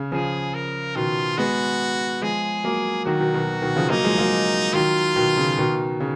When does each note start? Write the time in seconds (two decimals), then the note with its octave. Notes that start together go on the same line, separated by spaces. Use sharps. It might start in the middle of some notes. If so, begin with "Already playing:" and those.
Already playing: C#3
0.12 C#3 F3 G#4
0.54 A#4
0.95 B2 D#3 F4
1.38 G#3 B3 F#4
2.22 F3 G#3 G#4
2.64 F#3 A#3
3.06 D#3 F#3 F#4
3.20 B2 D#3
3.34 B2 D#3
3.62 B2 D#3
3.76 C#3 F3
3.90 F#3 A#3 D#4
4.04 F3 G#3
4.18 F#3 A#3
4.74 D#3 F#3 F4
5.16 B2 D#3
5.37 C#3
5.58 B2 D#3
6.00 C#3